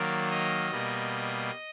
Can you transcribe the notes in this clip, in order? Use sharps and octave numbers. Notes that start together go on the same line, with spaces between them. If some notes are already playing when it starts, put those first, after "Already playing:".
Already playing: D#3 F#3 A#3 D5
D#5
B2 G3 A#3